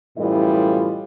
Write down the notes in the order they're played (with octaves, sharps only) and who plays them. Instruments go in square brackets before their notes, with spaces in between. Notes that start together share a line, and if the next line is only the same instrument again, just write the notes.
[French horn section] F#2 A2 E3 G3 F4 D#5